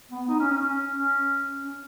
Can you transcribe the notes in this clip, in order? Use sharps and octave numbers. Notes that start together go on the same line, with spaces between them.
B3
D#4
C#4
C#4
C#4
C#4